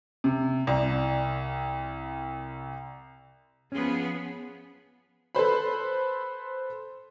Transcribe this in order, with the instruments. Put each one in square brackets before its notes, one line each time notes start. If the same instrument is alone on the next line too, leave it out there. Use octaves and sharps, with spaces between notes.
[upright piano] C3
C2
[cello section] F3 B3 G#4 [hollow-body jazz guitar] C#4
[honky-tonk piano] A4 B4 C5 B5